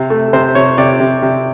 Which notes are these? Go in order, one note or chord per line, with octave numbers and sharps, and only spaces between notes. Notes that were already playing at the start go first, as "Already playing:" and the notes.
Already playing: C3
A3
C3 C5
C3 C#5
C3 D5
C3
C3